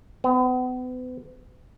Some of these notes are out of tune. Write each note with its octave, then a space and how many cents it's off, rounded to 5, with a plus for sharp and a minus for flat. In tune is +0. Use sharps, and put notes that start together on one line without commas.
B3 +40